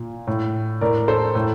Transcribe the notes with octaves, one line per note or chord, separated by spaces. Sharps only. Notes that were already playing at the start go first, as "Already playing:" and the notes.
Already playing: A#2
A2
A2 A#4 D5
A4 C5
A2